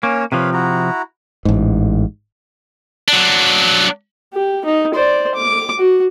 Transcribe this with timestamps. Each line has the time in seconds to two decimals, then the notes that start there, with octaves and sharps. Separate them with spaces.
0.03 A#3 C#4 C#5
0.32 C3 F3 B4 C#5 F5
0.53 E4 F#4 A#5
1.45 A1 G#2
3.08 F#3 D4
4.33 G4
4.65 D#4
4.95 C5 D5
5.35 D6
5.78 F#4